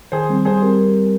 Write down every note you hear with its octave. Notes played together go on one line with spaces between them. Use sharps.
D#3 G#4 C5
G3 C4
G3 G#4 C5
C4 G4 A#4